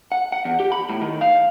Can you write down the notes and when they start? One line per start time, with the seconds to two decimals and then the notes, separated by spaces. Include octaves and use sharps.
0.12 F#5
0.32 F#5
0.45 E2
0.60 G4
0.72 B5
0.89 A2
1.02 D#3
1.21 F5